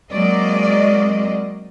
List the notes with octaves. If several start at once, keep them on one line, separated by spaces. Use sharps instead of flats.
F#3 G#3 A#3 C4 D5 D#5